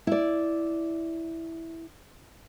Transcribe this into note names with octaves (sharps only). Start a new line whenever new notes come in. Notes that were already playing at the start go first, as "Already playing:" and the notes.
E4 D5